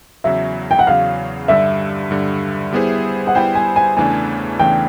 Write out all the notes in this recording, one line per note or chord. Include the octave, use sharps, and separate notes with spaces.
E2 C#3 F#3 E5
G5
F#5
E2 C#3 F#3 F5
G2 D3 G3 E5
G2 D3 G3
G3 B3 E4 G#4 C5
F#5
G3 B3 E4 G#4 C5 G5
G#5
G#5
E2 C#3 E3 A3 D4 G#5
E2 C#3 E3 A3 D4 G5